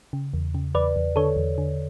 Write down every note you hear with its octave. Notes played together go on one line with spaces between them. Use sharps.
C#3
E2
C#3
E2 B4 D5
E2
D3 A4 C#5
E2
D3